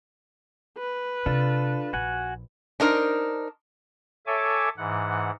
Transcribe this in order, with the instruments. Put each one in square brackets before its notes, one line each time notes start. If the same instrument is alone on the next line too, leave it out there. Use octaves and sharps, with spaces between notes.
[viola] B4
[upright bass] C3 [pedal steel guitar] D4 F4 A4
[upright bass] A#1 [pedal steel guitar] F#4 F#5 G#5
[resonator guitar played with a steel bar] D4 D#4 A#4 C5
[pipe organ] A4 C#5 E5 G#5 D6
G#2 E3 F#5